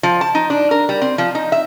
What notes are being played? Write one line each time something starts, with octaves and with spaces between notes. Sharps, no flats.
F3
A5
D#4
D4
A#4
G3
C4
F3
D#4
E5